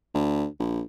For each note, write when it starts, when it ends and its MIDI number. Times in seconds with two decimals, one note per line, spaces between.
0.14 0.46 38
0.60 0.82 34